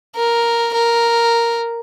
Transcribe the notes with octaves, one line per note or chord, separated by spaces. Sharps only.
A#4
A#4